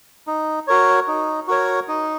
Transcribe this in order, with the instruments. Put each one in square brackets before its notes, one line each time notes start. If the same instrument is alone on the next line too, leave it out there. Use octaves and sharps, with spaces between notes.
[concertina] D#4
F#4 A#4 C#5
D#4
F#4 A#4 C#5
D#4